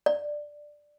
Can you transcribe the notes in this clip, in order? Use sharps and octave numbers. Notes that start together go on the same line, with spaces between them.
D5